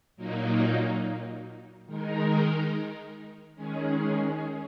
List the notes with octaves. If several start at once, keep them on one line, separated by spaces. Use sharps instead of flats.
A#2 F#3 A#3 D#4
D#3 G#3 D#4 A#4
D#3 G#3 C#4 G#4